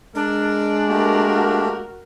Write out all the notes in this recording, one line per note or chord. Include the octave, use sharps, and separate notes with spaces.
G#3 D4 A#4
A3 A#3 F#4 G4 A#4